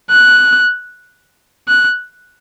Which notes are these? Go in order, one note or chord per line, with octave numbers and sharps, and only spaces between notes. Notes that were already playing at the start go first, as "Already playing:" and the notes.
F#6
F#6